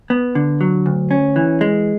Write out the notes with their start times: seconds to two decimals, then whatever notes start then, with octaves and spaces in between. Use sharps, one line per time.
0.10 B3
0.35 D3
0.61 F#3
0.86 D2
1.11 C#4
1.36 E3
1.61 G#3